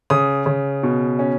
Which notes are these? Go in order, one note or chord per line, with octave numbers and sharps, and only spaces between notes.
C#3 D#6
C#3
B2
C#4